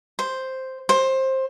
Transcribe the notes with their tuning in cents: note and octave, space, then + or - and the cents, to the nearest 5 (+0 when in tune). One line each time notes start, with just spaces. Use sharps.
C5 +0
C5 +15